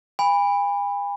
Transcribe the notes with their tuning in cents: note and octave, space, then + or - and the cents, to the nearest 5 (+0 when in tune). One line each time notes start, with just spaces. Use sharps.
G#5 -45 B5 +0